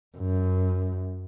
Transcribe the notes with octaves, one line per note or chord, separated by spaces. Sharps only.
F#2